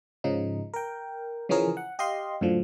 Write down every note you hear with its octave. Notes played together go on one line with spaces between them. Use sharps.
G#2 C#3 F3 D#4
A#4 G5
C#3 E3 F3 C#4 G#4 A#4
F#5
G4 D#5 F5 C6
F#2 A2 D3 F3